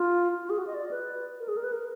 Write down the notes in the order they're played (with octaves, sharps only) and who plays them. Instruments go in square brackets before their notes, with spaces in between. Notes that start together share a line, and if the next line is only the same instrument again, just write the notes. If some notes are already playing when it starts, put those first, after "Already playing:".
Already playing: [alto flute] F4
F4
G#4
F#4
D#5
D5
B4
A#4
G#4
A#4
B4
A#4